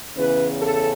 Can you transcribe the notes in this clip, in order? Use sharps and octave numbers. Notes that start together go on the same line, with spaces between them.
E2 C#3 E3 C#4 B4
A4